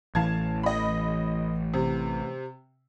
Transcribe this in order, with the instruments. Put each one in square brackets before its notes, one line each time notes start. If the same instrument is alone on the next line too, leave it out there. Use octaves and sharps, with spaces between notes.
[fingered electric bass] A1 E3 [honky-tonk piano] F5 A5 G#6
[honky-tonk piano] D#5 B5
C3